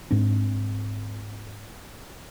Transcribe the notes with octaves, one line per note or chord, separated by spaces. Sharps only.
G#2 C4 D4